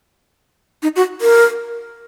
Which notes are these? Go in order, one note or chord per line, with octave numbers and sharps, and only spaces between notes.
D#4
F#4
A#4